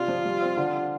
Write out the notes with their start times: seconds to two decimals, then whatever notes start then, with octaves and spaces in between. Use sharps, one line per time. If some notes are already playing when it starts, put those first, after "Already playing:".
Already playing: C3 D4 F4
0.08 F3
0.25 G3
0.41 C4
0.57 D3